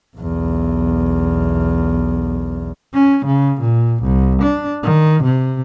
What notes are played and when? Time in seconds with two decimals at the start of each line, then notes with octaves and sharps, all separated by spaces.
0.16 B1 E2
2.94 C#4
3.26 C#3
3.61 A#2
4.03 C2
4.42 D4
4.83 D#3
5.24 C3